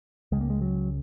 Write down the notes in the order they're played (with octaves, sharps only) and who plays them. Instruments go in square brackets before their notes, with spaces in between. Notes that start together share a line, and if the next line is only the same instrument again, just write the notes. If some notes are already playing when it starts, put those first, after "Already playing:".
[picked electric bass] C#2 C#3 G#3
A#3
G#3
F#3